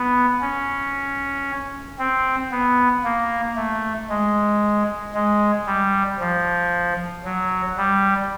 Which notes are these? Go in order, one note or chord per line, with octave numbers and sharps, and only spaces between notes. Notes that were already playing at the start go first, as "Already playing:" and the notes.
Already playing: B3
C#4
C4
B3
A#3
A3
G#3
G#3
G3
F3
F#3
G3